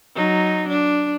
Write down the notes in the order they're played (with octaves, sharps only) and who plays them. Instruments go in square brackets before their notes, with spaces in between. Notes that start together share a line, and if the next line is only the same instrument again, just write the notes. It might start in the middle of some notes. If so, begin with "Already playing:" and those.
[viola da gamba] F#3 D#4
D4